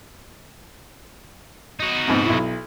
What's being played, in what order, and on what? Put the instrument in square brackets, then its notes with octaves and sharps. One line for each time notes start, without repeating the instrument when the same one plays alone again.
[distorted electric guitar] D#4 F#4
[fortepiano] F2 G#2 B2
B1 E4